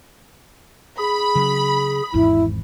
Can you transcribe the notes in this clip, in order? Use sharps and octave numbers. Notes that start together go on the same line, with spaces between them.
G#4 B5
C#3 F#3
G#1 E2 G#2 E4